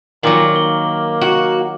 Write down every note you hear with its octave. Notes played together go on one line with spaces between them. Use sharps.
A#2 D#3 F#3 D6 F6 F#7
A#3 G7
F#4